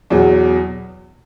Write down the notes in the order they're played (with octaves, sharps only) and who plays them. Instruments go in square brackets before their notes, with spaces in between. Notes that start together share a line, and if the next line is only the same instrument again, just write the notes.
[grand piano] E2 B2 F#3